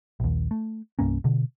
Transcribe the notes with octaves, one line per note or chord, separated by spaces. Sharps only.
A#1 D#2
A3
C2 G2 A#3 C#4
B2 D3